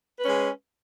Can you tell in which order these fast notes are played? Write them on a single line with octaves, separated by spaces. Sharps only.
B4 C#4 G#3